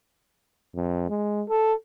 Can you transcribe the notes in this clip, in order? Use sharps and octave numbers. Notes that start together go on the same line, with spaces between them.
F2
G#3
A4